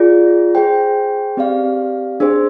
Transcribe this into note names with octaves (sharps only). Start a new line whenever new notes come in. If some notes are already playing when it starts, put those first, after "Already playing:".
Already playing: F4 G#4 D5
G#4 C5 G5
C4 G4 D5 F5
D4 G#4 C5